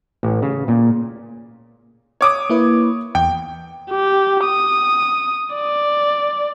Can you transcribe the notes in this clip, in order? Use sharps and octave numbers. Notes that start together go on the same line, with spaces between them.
A1
C#3
A#2
C#5 D6 D#6
A#3 E4 B4
E2 G5
G4
D#6
D5